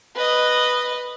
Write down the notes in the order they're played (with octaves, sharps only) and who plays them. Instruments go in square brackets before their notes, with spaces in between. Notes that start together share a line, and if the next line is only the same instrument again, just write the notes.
[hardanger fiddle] B4 D#5